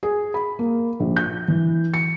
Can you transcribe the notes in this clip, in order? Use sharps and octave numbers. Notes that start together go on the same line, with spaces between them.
G#4
B5
A#3
A#1
G6
E3
C#7